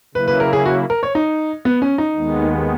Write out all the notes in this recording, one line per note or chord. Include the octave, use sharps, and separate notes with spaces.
C#3 F#3 A#3 E4 B4
B4
A#4
G#4
F#4
A#4
C#5
D#4
B3
C#4
D#4
D#2 D#3 G#3 B3